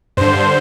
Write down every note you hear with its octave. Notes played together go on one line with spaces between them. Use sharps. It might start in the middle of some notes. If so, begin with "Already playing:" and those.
G2 D3 C5